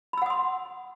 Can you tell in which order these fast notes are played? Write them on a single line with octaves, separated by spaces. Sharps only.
B5 E6 F#5 D#6 C6